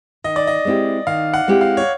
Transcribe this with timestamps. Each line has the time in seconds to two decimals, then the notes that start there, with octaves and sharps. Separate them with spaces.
0.24 D#3 D#5
0.36 D5
0.47 D#5
0.65 G#3 C4 E4 G4
1.07 D#3 F5
1.34 F#5
1.48 G#3 C4 E4 G4
1.61 F5
1.77 C#5